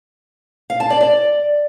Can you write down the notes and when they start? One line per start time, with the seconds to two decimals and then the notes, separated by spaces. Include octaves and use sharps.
0.70 F5
0.80 A5
0.90 D5
1.01 D5